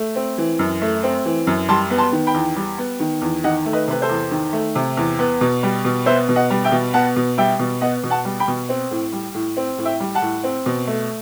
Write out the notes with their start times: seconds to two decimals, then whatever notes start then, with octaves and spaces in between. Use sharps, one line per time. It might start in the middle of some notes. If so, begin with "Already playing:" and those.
Already playing: A3
0.16 C4
0.38 E3
0.59 F#2
0.82 A3
1.03 C4
1.25 E3
1.47 F#2
1.69 G3 A5 C6
1.90 B3
1.98 A5 C6
2.12 D#3
2.27 G5 B5
2.34 E2
2.56 G3
2.78 B3
3.00 D#3
3.22 E2
3.44 D#3 D#5 F#5
3.65 A3
3.73 B4 D#5
3.88 C3 B4
4.02 A4 C5
4.09 E2
4.31 D#3
4.53 A3
4.75 C3
4.97 E2
5.19 B3
5.41 B2
5.63 G3
5.85 B2
6.06 B3 C5 E5
6.29 B2
6.36 D#5 F#5
6.50 G3
6.65 E5 G5
6.72 B2
6.94 B3 F#5 A5
7.16 B2
7.38 G3 E5 G5
7.59 B2
7.81 B3 D#5 F#5
8.04 B2
8.10 F#5 A5
8.25 G3
8.40 G5 B5
8.48 B2
8.69 C4
8.91 A2
9.13 G3
9.34 A2
9.57 C4
9.78 A2
9.85 E5 G5
10.00 G3
10.15 F#5 A5
10.22 A2
10.44 C4
10.66 B2
10.87 A3